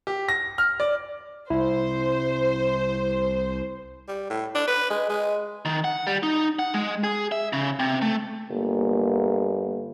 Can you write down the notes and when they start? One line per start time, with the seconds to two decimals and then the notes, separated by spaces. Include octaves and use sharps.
0.07 G4
0.29 A#6
0.58 F6
0.80 D5
1.50 C2 E4 C5
4.08 G3
4.30 A2
4.55 D4
4.68 B4
4.90 G#3
5.09 G#3
5.65 D#3
5.84 F#5
6.07 G3
6.23 D#4
6.59 F#5
6.74 G#3
7.04 G#4
7.32 E5
7.53 C#3
7.79 C3
8.02 A3
8.50 G1 A#3